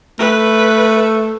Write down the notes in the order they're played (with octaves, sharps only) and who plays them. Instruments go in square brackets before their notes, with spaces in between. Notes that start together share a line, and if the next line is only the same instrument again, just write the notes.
[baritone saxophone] A3 [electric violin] B4